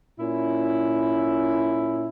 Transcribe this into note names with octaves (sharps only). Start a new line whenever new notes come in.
A#2 C#4 E4